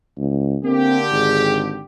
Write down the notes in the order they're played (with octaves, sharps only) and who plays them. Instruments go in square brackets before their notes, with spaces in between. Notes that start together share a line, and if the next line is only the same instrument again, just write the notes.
[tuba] C#2
[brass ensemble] D3 G4 [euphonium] A#3 [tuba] C4
[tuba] G#1 [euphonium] G#4